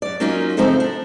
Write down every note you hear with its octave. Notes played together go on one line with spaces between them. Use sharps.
F#2 D5
F#3 A#3 C#4 D#4 F4
F#2 C#3 F3 A3 C4 D#4
D4